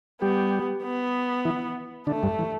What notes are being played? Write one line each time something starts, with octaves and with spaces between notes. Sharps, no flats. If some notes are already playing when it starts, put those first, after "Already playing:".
G3 B3 G4
B3
E3 E4
D3 A3 D4
G2 G3
E3